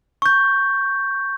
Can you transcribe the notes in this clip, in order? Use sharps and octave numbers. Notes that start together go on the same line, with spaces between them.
C#6 G6